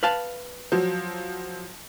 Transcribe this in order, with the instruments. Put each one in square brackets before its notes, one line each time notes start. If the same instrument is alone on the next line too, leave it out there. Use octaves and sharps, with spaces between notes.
[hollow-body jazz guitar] B4 F5 A5
[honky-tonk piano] F3 F#3